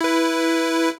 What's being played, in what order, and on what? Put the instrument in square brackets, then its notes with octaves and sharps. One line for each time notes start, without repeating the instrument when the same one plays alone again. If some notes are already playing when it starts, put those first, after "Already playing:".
[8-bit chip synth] E4 B4